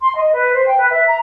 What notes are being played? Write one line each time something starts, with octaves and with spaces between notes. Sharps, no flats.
C6
D#5
B4
C5
G5
B4
E5
A#5